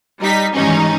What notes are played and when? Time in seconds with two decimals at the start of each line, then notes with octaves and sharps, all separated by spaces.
0.21 G3 D#4 B6
0.54 G#2 D#3 E3 G3 C#4 D#4